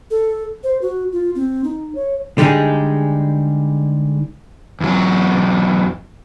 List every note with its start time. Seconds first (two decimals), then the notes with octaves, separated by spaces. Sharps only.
0.11 A4
0.64 C5
0.82 F#4
1.12 F4
1.35 C4
1.64 D#4
1.95 C#5
2.38 D3 G3 G#3 D#4 G#4
4.81 E2 F#3